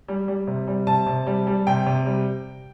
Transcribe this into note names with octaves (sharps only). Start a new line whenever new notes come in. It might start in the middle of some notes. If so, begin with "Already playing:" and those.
G3
G3
C3
G3
C3 A5
C3
G3
G3
C3 G5
C3
G3